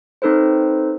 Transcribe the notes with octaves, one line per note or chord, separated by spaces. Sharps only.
C4 D#4 A4 B4 C5